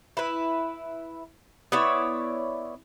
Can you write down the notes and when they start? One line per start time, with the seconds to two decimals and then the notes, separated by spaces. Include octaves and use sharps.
0.17 E4 B4
1.72 B3 E4 C#5 D5